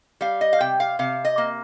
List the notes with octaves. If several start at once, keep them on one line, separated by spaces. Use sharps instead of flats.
G3 F5
D#5
F5
C3 G5
F5
C3 F5
D#5
A#3